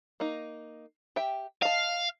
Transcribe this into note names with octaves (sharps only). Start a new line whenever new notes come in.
A#3 D#4
G4 E5 G5
D#5 F5 A5